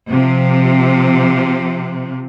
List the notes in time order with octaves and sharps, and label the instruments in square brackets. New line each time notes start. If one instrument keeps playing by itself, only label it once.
[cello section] C3 F3